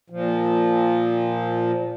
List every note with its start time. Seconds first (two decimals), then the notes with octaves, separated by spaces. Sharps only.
0.10 A#2 F3